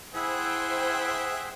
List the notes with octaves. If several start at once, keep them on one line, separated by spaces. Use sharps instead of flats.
E4 G#4 C5 E5 F#5 G5